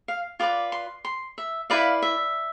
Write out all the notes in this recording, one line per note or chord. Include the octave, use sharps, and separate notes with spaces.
F5
F4 B4 D5 D6
C6
C6
E5
E4 B4 D5 F5
E5